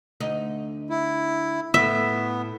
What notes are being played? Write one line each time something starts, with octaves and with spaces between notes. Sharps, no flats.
D2 D#4 D#5
E4
A2 B3 E5